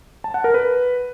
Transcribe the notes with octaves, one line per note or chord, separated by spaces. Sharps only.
A5
F#5
A#4
B4